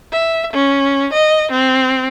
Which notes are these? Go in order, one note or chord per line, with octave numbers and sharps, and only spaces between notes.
E5
C#4
D#5
C4